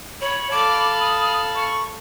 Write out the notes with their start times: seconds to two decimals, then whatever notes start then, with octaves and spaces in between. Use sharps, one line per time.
0.21 C#5 B5
0.51 A4 F5 D6
1.00 D#6
1.55 C#6